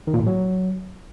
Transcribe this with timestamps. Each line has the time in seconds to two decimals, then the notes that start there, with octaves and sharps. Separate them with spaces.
0.07 D#3
0.14 A#2
0.20 A2
0.26 F#3